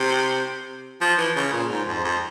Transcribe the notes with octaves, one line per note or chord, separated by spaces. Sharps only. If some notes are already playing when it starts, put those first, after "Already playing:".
Already playing: C3
F3
E3
C#3
A#2
G#2
F2
F2